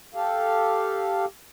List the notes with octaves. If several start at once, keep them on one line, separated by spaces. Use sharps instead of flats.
G4 A4 F5